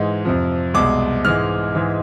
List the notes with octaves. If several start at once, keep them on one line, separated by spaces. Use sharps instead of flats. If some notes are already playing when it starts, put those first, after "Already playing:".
Already playing: G#2 E3 G#3
F2 C3 F3
C2 B2 G#3 D6
G#2 E3 G#3 F6
G#2 E3 G#3